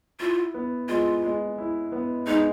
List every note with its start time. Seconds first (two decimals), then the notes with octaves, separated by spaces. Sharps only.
0.20 E4 F4
0.54 B3
0.89 G#3 F4
1.23 G#3
1.58 E4
1.92 B3
2.27 G#3 D#4